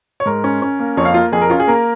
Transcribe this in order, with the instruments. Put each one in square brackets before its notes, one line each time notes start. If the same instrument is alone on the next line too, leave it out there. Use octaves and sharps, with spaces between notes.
[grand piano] C#5
G#2 A#4
C#4
C#4
A#3
F2 C#5
F5
A#3 F4
F2 G#4
A#4
C#4 F4
G#4
A#3 A#4